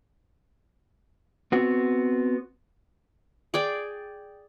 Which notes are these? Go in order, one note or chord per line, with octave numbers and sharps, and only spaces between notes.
B3 C4 F#4
G#4 D5 G5